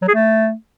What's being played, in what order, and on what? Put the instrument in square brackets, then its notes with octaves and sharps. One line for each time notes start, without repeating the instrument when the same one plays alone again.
[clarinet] F#3
G#4
A3